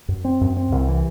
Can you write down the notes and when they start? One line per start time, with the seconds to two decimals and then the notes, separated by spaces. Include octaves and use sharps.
0.08 F#2
0.25 C4
0.41 F#2
0.57 C4
0.72 C2
0.88 E3